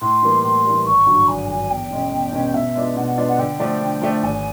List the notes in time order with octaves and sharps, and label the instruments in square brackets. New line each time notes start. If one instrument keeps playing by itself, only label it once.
[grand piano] A2 [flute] C6
[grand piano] E3 G3 A#3
[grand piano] A2 [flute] C6
[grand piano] E3 G3 A#3
[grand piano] G#1 [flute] C#6
[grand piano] G2 D3 F#3
[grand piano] G#1 [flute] G#5
[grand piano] G2 D3 F#3 [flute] G#5
[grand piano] E2 [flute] G5
[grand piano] B2 G#3 C#4
E2
B2 G#3 C#4
[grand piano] B2 [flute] E5
[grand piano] G#3 B3 D4 F4
[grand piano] B2 [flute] F#5
[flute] F#5
[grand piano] G#3 B3 D4 F4
[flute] F#5
[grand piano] D3 [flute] G5
[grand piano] F3 A3 D4
D3
F3 A3 D4
[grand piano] G#1 [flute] G#5